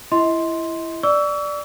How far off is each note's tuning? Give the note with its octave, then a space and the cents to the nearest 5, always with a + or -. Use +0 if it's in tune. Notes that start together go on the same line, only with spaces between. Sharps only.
E4 +20 D#5 +40 C6 +0
D5 +0 C#6 +45 E6 +0